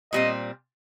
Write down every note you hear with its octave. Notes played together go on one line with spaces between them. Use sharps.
A#2 G3 C4 D#5